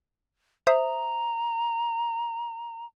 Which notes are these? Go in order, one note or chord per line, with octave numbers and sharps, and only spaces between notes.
C5 E5 A#5 D#6